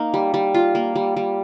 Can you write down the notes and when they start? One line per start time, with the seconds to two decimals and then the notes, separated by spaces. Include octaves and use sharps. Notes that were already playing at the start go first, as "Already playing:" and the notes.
Already playing: A#3 D#4
0.14 G3
0.34 G3
0.54 F4
0.75 A#3
0.96 G3
1.16 G3